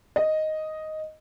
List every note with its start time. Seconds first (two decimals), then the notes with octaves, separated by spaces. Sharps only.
0.16 D#5